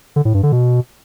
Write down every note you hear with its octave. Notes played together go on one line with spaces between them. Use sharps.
D3
A2
G2
D3
B2